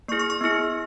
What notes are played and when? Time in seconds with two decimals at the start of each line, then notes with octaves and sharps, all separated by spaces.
0.08 A#3 C#6
0.12 E4 G#4
0.19 C#6
0.30 C#6
0.41 B3 E4 G#4